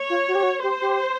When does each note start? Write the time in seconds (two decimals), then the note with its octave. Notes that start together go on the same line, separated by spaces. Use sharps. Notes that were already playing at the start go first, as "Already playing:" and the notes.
Already playing: C#5
0.10 F4
0.28 F#4
0.35 G4
0.43 F#4
0.63 G4 C5
0.82 G4